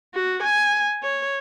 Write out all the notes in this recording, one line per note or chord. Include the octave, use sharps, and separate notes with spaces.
F#4
G#5
C#5